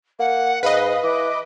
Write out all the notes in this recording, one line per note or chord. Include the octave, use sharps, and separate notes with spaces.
A#3 F#5
G#2 B4 D#5 F5
E3 D6